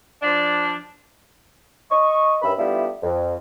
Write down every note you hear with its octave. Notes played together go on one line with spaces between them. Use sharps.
F3 D4
D#5 C#6
G2 D#3 C#4 E5 B5
G3 A3 B3 D4 E4 F4
F2